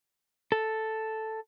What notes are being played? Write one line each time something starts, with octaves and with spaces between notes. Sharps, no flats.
A4